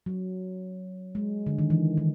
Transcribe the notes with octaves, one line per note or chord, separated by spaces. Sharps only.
F#3
G#3
D3
D#3
E3
D#3